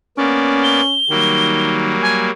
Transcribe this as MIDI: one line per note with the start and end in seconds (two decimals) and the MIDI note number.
0.18 0.81 58
0.18 0.81 59
0.18 1.00 61
0.18 0.81 74
0.63 1.73 103
1.10 1.96 51
1.10 2.30 54
1.10 2.30 55
1.10 2.30 58
2.02 2.26 80